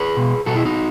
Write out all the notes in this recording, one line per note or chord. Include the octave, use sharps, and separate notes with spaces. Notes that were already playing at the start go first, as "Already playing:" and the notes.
Already playing: G#4 B4
B2
B2 F#4 A4
E4 G#4
D#4 F#4